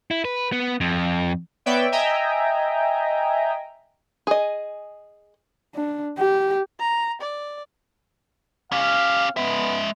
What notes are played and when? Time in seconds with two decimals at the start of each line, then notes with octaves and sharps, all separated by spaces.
0.11 E4
0.25 B4
0.53 B3
0.81 F2
1.66 B3 B4 C#5 D5 E5 G5
1.92 D#5 E5 G5 G#5 A#5
4.27 G#4 D#5
5.75 D4
6.18 G4
6.80 A#5
7.21 D5
8.72 C#4 G4 F5
9.37 G#3 B3 E5